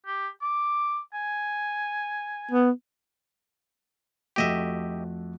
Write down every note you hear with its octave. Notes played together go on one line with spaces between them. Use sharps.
G4
D6
G#5
B3
F2 A3 F#4 G4 D#5 E5